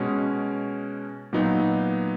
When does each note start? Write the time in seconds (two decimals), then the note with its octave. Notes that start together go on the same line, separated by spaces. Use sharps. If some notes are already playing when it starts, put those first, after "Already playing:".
Already playing: B2 G#3 C#4
1.33 A#2 F#3 B3 D#4